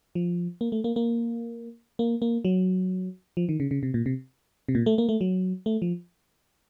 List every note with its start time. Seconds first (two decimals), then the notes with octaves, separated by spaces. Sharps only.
0.15 F3
0.61 A#3
0.72 A3
0.84 A#3
0.96 A#3
1.99 A#3
2.22 A#3
2.45 F#3
3.37 F3
3.49 D#3
3.60 C#3
3.71 C#3
3.83 C3
3.94 A#2
4.06 C3
4.69 C3
4.75 A#2
4.86 A3
4.98 A#3
5.09 A3
5.21 F#3
5.66 A3
5.82 F3